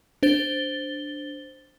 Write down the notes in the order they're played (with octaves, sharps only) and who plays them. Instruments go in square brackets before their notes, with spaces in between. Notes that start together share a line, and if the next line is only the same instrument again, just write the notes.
[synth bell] D4 C5 A6 G7